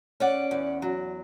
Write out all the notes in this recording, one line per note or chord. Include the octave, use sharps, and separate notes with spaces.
C#4 D5 F#5
E2
F#3